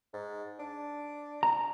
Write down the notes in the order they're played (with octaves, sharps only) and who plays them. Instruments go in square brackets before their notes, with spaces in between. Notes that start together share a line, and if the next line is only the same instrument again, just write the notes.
[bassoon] G#2
D4
[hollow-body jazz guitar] A#5